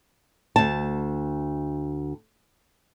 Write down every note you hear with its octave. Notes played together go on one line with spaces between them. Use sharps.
D2 A5